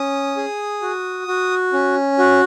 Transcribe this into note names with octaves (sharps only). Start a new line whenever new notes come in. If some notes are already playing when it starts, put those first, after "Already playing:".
Already playing: C#4 D#6
G#4
F#4
F#4
C#4
F#4